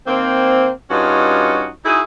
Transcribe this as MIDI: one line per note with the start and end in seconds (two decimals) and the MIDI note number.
0.07 0.70 51
0.07 0.70 58
0.07 0.70 60
0.90 1.69 43
0.90 1.69 61
0.90 1.69 63
0.90 1.69 65
0.90 1.69 66
1.85 2.01 63
1.85 2.01 64
1.85 2.01 66
1.85 2.01 68